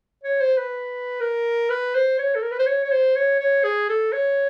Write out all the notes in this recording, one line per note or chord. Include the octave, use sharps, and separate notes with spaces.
C#5
C5
B4
A#4
B4
C5
C#5
A4
A#4
B4
C5
C#5
C#5
C5
C#5
C#5
G#4
A4
C#5